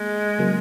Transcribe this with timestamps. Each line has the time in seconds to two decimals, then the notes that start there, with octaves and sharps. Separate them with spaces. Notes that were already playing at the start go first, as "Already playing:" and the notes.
Already playing: G#3 A#3
0.39 C#3 F#3 A#3